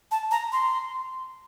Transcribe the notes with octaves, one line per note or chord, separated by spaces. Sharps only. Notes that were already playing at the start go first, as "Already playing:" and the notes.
A5
A#5
C6